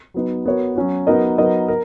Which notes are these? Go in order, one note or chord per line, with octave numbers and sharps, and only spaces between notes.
F#3 B3 D#4
B3 F#4 A#4 C#5
F#3 C#4 F#4
F#3 B3 D#4 A#4 D#5
F#3 B3 D#4 A#4 D#5
A#4